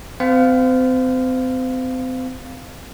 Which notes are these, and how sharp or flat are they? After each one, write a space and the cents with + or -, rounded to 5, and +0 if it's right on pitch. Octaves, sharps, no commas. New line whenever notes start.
C4 -35 C5 -35 F5 +0